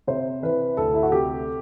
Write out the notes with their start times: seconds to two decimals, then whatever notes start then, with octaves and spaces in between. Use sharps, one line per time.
0.07 C3 C5
0.42 E3 B4
0.77 D2 A4
0.94 E4
1.03 F#4
1.12 C3 G4